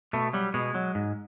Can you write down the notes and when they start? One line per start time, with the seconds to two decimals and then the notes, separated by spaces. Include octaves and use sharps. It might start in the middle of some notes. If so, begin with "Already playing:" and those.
0.13 B2 A3
0.33 F#3 G3
0.54 B2 G#3
0.75 F#3
0.95 G#2